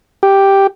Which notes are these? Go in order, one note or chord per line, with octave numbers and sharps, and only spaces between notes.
G4